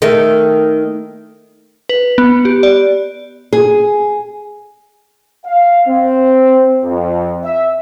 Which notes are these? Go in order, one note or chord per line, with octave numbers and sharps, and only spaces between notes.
D#3 A3
B4
B3
G4
D5
G#4
F5
C4
F2
E5